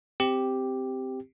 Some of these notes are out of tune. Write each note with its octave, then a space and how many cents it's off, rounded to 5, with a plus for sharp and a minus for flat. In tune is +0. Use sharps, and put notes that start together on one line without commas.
C4 -10 G4 +0